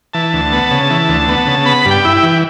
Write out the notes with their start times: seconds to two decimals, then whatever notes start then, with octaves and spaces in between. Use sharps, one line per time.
0.14 E3 A5
0.33 D2
0.53 B3
0.71 C#3
0.90 E3
1.09 D2
1.29 B3
1.47 C#3
1.65 B3 B5
1.86 G2
1.91 G5
2.05 E4
2.17 G5
2.23 E3